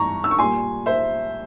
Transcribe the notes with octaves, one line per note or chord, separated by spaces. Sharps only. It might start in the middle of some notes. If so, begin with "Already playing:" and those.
Already playing: G2 E3 A#5 C#6
E6
C#6
A#2 G3 G#5 C6
C5 E5